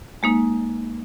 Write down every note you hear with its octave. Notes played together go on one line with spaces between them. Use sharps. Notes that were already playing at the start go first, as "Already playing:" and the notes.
G#3 A#3 D#4